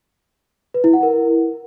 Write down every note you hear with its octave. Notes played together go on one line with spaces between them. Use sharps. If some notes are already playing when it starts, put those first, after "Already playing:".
B4
E4
F#5
A#4